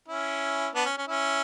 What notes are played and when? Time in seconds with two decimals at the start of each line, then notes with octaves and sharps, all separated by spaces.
0.08 C#4 E4
0.75 B3 D4
0.85 C#4
0.98 C#4
1.08 C#4 E4